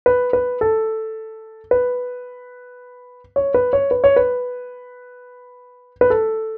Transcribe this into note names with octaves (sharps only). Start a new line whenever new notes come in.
B4
B4
A4
B4
C#5
B4
C#5
B4
C#5
B4
B4
A4